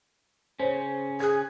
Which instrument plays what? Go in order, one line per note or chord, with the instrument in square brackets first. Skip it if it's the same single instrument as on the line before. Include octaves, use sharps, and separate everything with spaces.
[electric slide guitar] C#3 C#4 [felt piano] C5 C#5
[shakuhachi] G#4 [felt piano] F#6 G#6